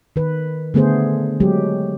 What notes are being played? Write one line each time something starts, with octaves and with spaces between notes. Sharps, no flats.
D#3 B4
D3 A3 B3 G#4 C5
F#3 G#3 G4